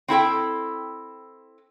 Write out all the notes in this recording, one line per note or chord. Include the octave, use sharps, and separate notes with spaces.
C4 E4 A4 G5